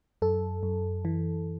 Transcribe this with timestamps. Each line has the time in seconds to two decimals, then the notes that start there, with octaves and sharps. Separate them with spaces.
0.22 F#2 A4
0.63 F#2
1.05 E3